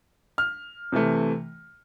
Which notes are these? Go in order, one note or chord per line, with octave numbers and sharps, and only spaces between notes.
F6
C3 E3 A3